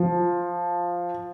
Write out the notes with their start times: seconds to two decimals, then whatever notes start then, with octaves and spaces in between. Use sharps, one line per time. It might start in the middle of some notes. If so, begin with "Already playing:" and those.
Already playing: F3